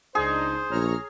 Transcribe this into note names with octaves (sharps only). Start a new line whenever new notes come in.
C#2 D4 D#4 G#4 C5
A#1 C#5 A#5 F6